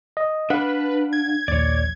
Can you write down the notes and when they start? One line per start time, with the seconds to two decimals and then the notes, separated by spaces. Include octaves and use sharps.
0.17 D#5
0.50 D4 B4 F5 F#5
1.13 G#6
1.48 A#1 D#2 C#5 D5